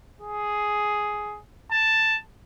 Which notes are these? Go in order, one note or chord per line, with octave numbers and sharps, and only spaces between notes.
G#4
A5